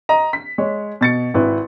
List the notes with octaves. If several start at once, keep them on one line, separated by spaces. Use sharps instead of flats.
D#5 A#5
B6
G#3 C#5
B2 A6 C#7
G#1 E4 B4